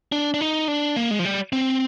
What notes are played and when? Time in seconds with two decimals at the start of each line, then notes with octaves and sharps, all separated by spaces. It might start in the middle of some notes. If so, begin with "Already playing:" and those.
0.12 D4
0.34 D4
0.41 D#4
0.68 D4
0.96 A#3
1.11 G#3
1.19 F3
1.25 G3
1.53 C4